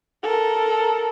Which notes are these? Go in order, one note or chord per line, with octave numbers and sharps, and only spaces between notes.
A4 A#4